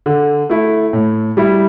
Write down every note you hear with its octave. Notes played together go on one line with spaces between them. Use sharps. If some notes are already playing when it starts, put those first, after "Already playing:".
D3
A3 E4
A2
G3 E4